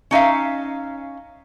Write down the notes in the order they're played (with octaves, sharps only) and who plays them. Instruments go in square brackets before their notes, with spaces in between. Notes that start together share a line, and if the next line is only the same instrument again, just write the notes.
[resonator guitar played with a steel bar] C#4 D#4 E5 F5